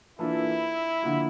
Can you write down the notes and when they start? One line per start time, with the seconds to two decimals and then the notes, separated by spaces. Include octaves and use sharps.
0.19 E3 A#3 D4 E4 F4 A4
1.02 D3 F3 A#3